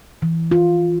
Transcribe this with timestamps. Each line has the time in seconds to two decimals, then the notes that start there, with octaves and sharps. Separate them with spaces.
0.22 E3
0.51 F4